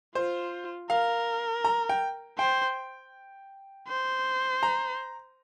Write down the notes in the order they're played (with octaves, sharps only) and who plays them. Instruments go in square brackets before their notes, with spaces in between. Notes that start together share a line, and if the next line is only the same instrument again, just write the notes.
[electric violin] F4 [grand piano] C5
[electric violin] A#4 [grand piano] F5
[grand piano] A#5
G5
[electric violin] C5 [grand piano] G5
[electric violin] C5
[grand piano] A#5